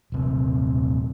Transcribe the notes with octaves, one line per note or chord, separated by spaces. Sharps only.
D#1 C3